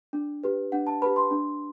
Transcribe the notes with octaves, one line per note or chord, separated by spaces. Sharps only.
D4
G4 B4
D4 F#5
A5
G4 B4 B5
C6
D4